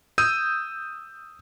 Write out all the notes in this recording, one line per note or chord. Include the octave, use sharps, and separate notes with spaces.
D#6 E6 G6 D#7